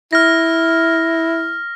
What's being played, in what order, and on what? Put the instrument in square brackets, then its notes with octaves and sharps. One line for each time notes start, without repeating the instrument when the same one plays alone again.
[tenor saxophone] E4 [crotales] F6 A#6